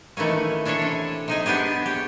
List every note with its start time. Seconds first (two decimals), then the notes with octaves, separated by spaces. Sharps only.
0.17 D#3 E3 A3 A#3 C#4
0.65 C#4 D4 E4 A4 C#5
0.82 C3
1.28 C3 D#4 G#4
1.46 B3 D4 G4 G#4
1.86 G4 C#5